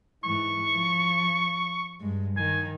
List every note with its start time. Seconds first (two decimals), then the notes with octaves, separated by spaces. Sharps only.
0.24 G#2 E3 C#6
0.73 F3
2.00 G2 G#3
2.37 D#3 G#5